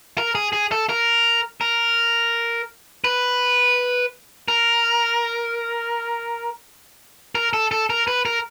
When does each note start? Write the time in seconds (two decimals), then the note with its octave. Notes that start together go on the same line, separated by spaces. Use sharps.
0.18 A#4
0.35 G#4
0.53 G#4
0.72 A4
0.89 A#4
1.61 A#4
3.04 B4
4.48 A#4
7.35 A#4
7.53 A4
7.71 A4
7.90 A#4
8.08 B4
8.25 A#4